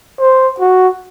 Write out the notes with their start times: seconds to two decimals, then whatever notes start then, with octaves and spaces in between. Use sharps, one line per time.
0.19 C5
0.60 F#4